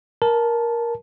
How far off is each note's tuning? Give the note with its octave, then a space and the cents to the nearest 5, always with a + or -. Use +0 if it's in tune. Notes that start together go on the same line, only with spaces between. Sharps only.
A#4 +10 A5 -10